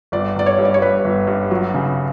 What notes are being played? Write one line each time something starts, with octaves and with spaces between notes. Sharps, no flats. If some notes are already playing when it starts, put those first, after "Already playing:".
G1 D5
G1 D5
C#5
G2
D5
C#5
G2 B4
G1
G2
F#3
C#3